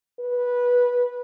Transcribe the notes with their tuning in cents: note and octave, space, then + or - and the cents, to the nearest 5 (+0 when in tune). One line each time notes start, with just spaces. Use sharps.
B4 -15